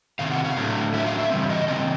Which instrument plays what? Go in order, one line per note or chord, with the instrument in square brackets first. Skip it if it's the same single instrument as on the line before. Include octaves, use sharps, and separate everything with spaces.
[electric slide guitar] C3 D#3 C4 F5
F#5
F5
A2 F#3 A3 D4
A2 F#3 A3 D4 E5
F5
E5
C#3 E3 G3 C4
D#5
C#3 E3 C4 D#5